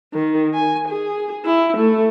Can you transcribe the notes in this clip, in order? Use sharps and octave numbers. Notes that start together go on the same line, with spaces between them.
D#3
G#5
G#4
E4
A3